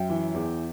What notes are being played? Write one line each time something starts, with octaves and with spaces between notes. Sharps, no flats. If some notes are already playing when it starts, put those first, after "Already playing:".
Already playing: F#2 E5 G5
E3
E2